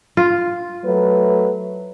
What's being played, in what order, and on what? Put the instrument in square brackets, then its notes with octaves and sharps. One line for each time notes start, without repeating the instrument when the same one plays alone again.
[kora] F4
[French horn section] F#3 A3 B4